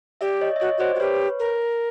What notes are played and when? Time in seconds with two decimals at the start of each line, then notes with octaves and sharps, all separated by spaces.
0.21 G4 D5 E5
0.41 C#5 D#5
0.56 E5
0.60 F#4 C#5 D#5
0.78 F#4 C5 D5
0.95 F#4
1.00 G4 B4 C#5
1.39 A#4